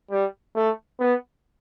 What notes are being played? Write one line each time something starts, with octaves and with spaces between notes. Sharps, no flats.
G3
A3
B3